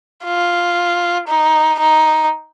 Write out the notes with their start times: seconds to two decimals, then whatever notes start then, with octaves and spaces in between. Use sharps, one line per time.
0.25 F4
1.28 D#4
1.80 D#4